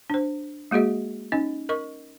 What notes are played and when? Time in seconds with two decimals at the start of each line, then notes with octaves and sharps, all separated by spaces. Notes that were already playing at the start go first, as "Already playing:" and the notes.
0.10 D4 C5
0.71 G#3 A#3 F#4 G#4 D#5
1.32 C#4 D#4 D#5
1.69 A#4 D#5 C#6